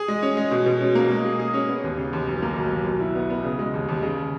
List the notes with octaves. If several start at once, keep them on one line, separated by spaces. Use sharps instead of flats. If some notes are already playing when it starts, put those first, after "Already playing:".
Already playing: G#4
G#3
C#4
G#3
B2
B2
C#4
A#3
G#3
G#4
G#4
C#4
B3
D#2
C#3
D#2
B1
A#3
B1
B1
B2
E4
B3
B3
C#3
G#3
D#2
D#2
C#3